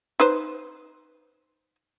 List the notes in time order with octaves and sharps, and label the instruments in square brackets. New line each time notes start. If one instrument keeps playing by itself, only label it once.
[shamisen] D#4 B4 C5